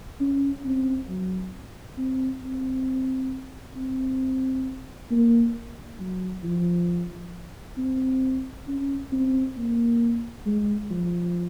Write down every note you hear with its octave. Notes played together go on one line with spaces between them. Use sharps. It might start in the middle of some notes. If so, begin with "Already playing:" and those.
C#4
C4
F#3
C4
C4
C4
A#3
F#3
F3
C4
C#4
C4
A#3
G#3
F3